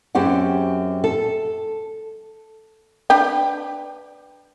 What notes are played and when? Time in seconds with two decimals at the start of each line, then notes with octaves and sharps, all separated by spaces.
0.15 F#2 C4 G4 G#4 F#5
1.04 A4
3.10 D4 B4 G5